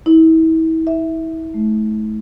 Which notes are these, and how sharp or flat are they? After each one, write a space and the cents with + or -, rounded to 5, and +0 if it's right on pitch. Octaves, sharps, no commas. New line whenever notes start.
E4 -35
E5 -5
A3 -30